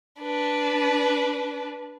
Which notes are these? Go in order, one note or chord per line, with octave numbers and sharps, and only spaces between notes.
D4 B4